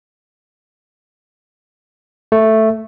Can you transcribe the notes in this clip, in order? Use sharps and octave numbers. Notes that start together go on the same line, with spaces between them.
A3